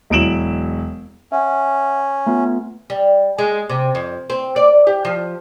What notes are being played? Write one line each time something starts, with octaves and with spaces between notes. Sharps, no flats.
E1 F#3 E4 D7 E7 F#7
C#4 E5 F#5
A3 B3 F4
G3
G#3
C3
F2
C4
D5
G4
F3